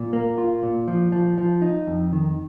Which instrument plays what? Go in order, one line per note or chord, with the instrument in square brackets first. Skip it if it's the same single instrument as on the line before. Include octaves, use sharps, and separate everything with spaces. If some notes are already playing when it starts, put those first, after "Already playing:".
Already playing: [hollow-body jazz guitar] A#2
A#3
F4
A#2
F3
F3
F3
D#4
F2
D#3